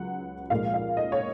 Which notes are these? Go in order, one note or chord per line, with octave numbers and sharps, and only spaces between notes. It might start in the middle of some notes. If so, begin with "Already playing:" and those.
Already playing: C#2 F#3 F#5
A#2 F3 G#3 F5
F5
D#5
C#5